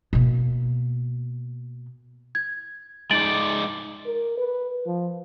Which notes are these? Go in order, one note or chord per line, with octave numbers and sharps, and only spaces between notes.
B2 A#3
G#6
G#3 D#4 D5 A6 D7 F#7
A#4
B4
F3